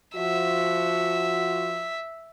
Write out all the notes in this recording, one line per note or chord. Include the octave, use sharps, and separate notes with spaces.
F3 F#4 E5